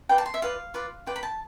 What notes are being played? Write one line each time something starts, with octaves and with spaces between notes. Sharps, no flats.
F4 B4 D5 G5
A5
C6
E5
F4 B4 D5 F5
F4 B4 D5
F4 B4 D5 G5
B5
A5